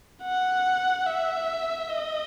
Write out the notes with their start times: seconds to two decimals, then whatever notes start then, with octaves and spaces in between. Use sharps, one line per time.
0.23 F#5
1.06 E5
1.89 D#5